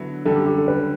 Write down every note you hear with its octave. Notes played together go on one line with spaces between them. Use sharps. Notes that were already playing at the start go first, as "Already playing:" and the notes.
Already playing: D3 F#3 B3 E4
F#2 D3 G3 A4
G4
G4
A4
B4